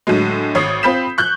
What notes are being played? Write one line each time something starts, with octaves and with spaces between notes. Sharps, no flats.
A2 D3 F#3 G#3
G#1 C#5 D#6 C7
C4 F4 B5 G6 B6 E7
C#6 F#6 G6